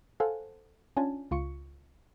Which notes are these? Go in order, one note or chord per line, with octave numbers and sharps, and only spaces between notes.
A4 C5 F5 F#5 G#5
C#4 D4 F4 G#5 A5
C#2 F4 C#6 C#7